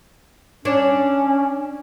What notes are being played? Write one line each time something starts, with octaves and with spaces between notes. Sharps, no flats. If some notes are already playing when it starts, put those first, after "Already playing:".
C#4 D4 C#5